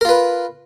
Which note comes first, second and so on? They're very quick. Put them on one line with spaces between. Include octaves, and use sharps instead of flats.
A#4 F4 B4